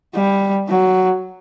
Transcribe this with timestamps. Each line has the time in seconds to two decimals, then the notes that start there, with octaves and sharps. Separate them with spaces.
0.14 G3
0.69 F#3